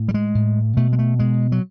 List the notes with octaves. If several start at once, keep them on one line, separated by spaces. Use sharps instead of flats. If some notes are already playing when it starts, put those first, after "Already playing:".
Already playing: A2
G3
G#3
A2
B2 A3
G#3
A3
B2 G#3
F#3